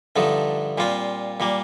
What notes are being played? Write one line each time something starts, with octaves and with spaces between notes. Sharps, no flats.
G2 D3 F3 A3 D#4
A#2 G3 C4 F4
A#2 G3 A#3